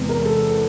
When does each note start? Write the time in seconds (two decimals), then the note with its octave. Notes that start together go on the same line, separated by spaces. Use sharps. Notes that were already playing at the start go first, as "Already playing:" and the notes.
Already playing: E2 C3 E3 G#3
0.09 A#4
0.26 A4